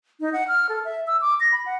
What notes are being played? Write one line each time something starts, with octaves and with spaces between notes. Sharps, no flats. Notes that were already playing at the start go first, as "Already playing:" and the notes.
D#4
F#5
F6
A4
E5
E6
D6
A#6
B5
F#5